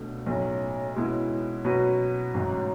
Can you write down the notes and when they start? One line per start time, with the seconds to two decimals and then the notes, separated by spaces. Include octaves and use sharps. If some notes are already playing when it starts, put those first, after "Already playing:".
Already playing: C#2 B2 A3 D4
0.26 B1 A2 F#3 C#4
0.96 B2 G#3 C#4 E4 B4
1.65 B2 F#3 C#4 F#4 B4
2.34 A1 G#2 F#3